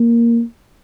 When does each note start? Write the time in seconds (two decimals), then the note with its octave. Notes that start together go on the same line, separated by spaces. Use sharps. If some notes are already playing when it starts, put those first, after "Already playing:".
Already playing: A#3